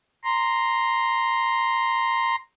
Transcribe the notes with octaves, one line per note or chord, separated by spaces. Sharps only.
A#5 C6